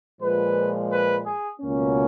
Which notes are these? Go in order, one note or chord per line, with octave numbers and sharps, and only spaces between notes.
A#2 F3 G#3 B4
B4
G#4
C#2 B2 A#3 C#4